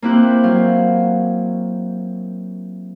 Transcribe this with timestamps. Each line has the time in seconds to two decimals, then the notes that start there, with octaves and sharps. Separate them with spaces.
0.02 A#3 C4 E4 G4 F#6 G6
0.43 F#3 F5